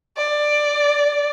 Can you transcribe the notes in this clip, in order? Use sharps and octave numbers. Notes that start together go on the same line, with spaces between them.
D5